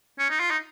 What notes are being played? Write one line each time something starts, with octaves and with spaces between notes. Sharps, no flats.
C#4
D#4
F4
D#4